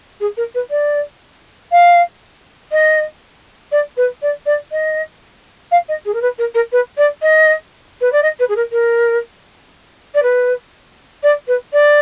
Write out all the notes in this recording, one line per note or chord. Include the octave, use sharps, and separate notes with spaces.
G#4
A#4
B4
D5
F5
D#5
D5
B4
D5
D5
D#5
F5
D#5
G#4
A#4
B4
A#4
A#4
B4
D5
D#5
B4
D5
D#5
B4
G#4
A#4
A#4
D5
B4
D5
B4
D5